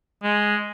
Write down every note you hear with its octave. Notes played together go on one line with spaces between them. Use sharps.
G#3